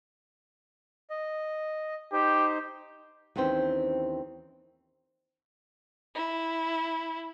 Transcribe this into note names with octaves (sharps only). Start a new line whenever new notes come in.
D#5
D#4 G4 C5
D#2 E3 C4 C#4 C5 G5
E4